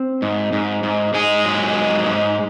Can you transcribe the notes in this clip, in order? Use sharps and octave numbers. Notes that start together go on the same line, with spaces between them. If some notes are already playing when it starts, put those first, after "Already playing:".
Already playing: C4
G#2
G#2
G#2
G#2 G#3 G#4
F#3
G#2
G#2